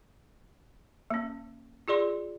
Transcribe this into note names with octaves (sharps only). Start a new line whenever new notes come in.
A#3 C#4
F4 G#4 D5 C6